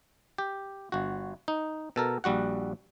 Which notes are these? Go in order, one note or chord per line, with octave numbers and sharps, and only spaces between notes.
G4
G1 F#4
D#4
B2 A4 A#4
A#1 G3 F#4 F#5